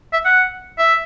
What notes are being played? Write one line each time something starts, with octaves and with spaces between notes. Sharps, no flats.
E5
F#5
E5